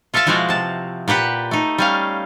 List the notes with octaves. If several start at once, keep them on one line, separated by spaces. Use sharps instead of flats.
F4 A4 E5 F5 A5
B2 F3 G#3 E4 F#4 F5
C3 A5
A#2 G4 B4 F#5
A3 D#4
G3 C#4 F5